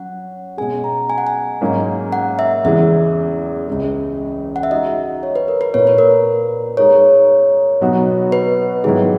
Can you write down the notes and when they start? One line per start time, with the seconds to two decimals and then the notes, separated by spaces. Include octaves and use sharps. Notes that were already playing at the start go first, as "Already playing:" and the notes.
Already playing: F#3 C#4 F#5
0.57 B2 G#3 C#4 G#4 G#5
0.84 A#5
1.10 G#5
1.18 F#5
1.27 G#5
1.61 G#2 F#3 A#3 C#4
2.12 F#5
2.39 E5
2.64 E2 C#3 E3 G#3 E5
3.68 C#2 C#3 G#3
4.56 F#5
4.63 E5
4.71 G#3 D#4 F#4 D#5
5.23 C#5
5.36 B4
5.48 A#4
5.61 B4
5.74 A#2 A#3 E4 C#5
5.87 B4
5.98 A#4
6.11 B4
6.77 G#3 D#4 A#4 C#5
7.81 B2 F#3 B3 D#4 F#4
8.32 B4
8.84 G#2 D#3 F#3 B3 E4 G#4